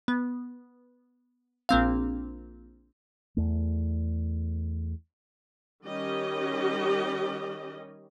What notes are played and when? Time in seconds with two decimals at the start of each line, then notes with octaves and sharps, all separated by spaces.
0.08 B3
1.69 A#1 A#3 C4 F5
3.37 E2 A3
5.84 D#3 G3 C#4 G4 D#5